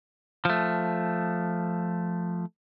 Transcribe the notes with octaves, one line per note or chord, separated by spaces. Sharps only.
F3 A3